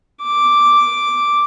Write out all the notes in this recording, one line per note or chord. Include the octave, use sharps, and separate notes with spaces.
D6